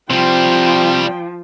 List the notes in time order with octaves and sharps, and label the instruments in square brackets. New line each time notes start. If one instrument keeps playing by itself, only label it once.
[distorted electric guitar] C3 G3 [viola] F3 [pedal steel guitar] C4 [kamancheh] G5